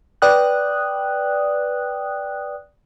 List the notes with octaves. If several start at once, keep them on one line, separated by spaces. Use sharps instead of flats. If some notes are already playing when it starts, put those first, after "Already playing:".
B4 D5 G5 D#6 F#6